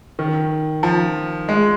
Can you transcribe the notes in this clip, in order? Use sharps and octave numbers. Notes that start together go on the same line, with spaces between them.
D#3
F3
G#3